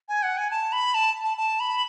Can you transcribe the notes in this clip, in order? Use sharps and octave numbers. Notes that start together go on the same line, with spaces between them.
G#5
F#5
G#5
A5
B5
A5
A5
A5
B5